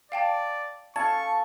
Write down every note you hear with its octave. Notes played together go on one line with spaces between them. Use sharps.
D5 F5 G5 A5
A4 F5 G#5 A5 C#6 G#6